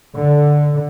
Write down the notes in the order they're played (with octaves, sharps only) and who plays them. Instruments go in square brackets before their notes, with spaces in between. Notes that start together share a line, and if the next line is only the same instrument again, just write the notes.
[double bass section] D3